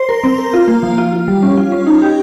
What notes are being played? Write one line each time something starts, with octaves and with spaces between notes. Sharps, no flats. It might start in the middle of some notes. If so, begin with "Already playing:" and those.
Already playing: C5
A#4
C4
A#4
F4
A#3
F3
F4
F4
G3
C#4
F4
C#4
D#4
G4